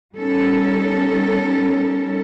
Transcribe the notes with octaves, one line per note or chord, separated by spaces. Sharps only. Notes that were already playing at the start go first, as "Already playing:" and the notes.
G3 B3 C#4 D#4 A4 A#4